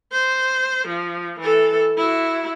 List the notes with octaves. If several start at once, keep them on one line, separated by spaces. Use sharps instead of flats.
C5
F3
E3 A4
E4 F#4